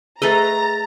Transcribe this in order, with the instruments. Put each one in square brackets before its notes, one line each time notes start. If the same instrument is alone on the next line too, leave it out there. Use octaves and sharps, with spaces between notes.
[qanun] A3 B4 D#5 [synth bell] G#4 A6 [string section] A#5